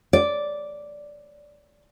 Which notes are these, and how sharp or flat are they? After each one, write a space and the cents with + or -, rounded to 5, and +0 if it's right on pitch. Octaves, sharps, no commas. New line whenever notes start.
D5 -5